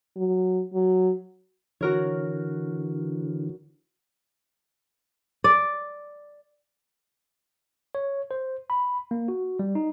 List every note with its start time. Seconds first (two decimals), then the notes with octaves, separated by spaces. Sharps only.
0.17 F#3
0.74 F#3
1.81 D3 E3 F#4 A#4 C#5
5.44 D5
7.95 C#5
8.31 C5
8.70 B5
9.11 A#3
9.28 F#4
9.59 G3
9.75 D#4